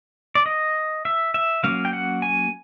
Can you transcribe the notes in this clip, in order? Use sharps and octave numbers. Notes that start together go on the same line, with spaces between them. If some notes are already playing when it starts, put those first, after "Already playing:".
D5
D#5
E5
E5
F#3 A#3 C#4 F5
G5
F#5
G#5